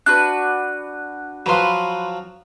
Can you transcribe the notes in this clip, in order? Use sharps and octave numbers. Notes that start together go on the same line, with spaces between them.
D4 F#4 B4 F#6
F3 F#3 B4 C6